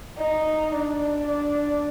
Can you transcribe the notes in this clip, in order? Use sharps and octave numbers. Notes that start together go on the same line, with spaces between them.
D#4
D4
D4